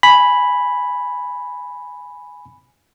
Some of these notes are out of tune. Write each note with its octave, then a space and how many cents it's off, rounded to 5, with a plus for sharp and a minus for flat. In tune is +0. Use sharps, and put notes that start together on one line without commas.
G#5 +0 B5 +0